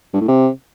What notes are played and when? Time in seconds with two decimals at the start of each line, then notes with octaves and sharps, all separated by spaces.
0.14 G2
0.21 A2
0.28 C3